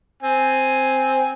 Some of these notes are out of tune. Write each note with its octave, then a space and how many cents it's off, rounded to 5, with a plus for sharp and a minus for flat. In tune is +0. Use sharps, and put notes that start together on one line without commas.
C4 +0 G#5 +0